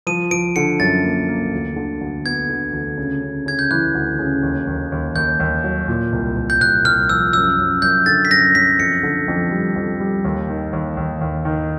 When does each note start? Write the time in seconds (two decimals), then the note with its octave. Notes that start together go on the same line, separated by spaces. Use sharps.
0.07 F3 D#7
0.31 F3 D7
0.56 D3 C#7
0.80 F#2 A6
1.04 A#3
1.29 A#3
1.52 D2
1.76 D3
2.01 D2
2.25 B3 G#6
2.49 D3
2.73 D2
2.98 C#3
3.22 C#3
3.46 C#3 G#6
3.59 G6
3.71 E3 F#6
3.95 D2
4.19 C#3
4.43 D#2
4.67 D#2
4.92 D#2
5.15 D#2 G6
5.40 D#2
5.64 F#3
5.88 A#2
6.13 C2
6.37 C2
6.50 G6
6.61 C2 F#6
6.85 C2 F6
7.09 F3 E6
7.33 F#2 E6
7.57 F#2
7.82 F#2 G6
8.06 D3 A6
8.25 B6
8.30 F#2 A#6
8.55 F#2 B6
8.79 F2 C#7
9.03 D3
9.28 F2
9.51 G3
9.76 F2
10.00 G3
10.24 D#2
10.49 D#3
10.73 D#2
10.97 D#2
11.21 D#2
11.45 D#3